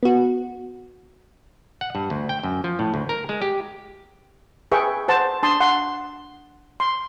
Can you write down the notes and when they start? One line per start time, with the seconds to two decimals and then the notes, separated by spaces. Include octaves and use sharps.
0.03 B3 F#4
1.81 F#5
1.95 G2
2.10 D2
2.29 G5
2.43 F#2
2.64 F3
2.79 A2
2.94 D2
3.09 A#4
3.29 G#3
3.42 G4
4.72 G#4 B4 E5 G5 C#6
5.08 B4 C5 F#5 A5
5.43 D4 A5 C6 D#6
5.60 F#5 C6
6.80 C6